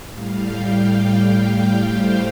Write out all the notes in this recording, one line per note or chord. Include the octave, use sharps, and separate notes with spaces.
A2 G3 F5
G5
G5
C5